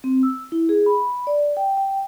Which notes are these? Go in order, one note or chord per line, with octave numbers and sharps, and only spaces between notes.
C4
E6
E4
G#4
B5
B5
D5
G5
G5